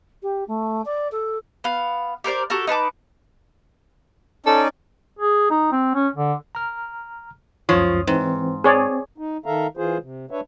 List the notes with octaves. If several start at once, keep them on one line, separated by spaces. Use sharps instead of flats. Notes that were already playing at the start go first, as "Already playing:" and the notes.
G4
A3
D5
A4
B3 F5
G4 A#4 C5 D5
F#4 G4 A4 A#4
D#4 B4 A5 D6
C#4 D#4 A4 D5
G#4
D#4
C4
C#4
D3
A#5 F6
C#2 F#2 F3 C#5 D#6
G#2 E3 C4
C4 G#4 C#5 D5
D#4
D#3 A4 E5 F5 A#5
E3 F4 G#4 C5
C3
D4 B4 C#5 E5